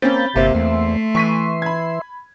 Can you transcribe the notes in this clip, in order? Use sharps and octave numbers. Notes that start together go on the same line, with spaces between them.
A#3 C4 C#4 B5 G6 A6
G1 C3 A#3 C4
E2 A3 E5 C6
E3 C#6 B6 D#7
B5 G#6